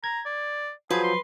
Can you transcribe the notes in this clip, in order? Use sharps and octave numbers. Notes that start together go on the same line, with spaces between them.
A#5 G#6
D5
F3 F#3 G#4 B4 C5
C6